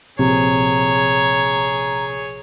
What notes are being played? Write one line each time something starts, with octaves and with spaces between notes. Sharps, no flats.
A#1 C3 G#4 C#5 A#5